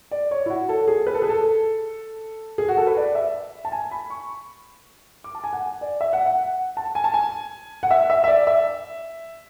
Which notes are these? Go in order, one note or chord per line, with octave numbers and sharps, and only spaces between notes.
D5
C#5
E4
F#4
A4
G#4
B4
A4
G#4
A4
G#4
F#4
A4
B4
D5
E5
A5
G#5
B5
C#6
D6
A5
G#5
F#5
D5
E5
F#5
F#5
A5
G#5
A5
G#5
F#5
E5
E5
E5
D5
E5